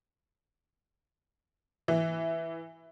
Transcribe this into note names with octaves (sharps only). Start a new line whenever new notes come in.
E3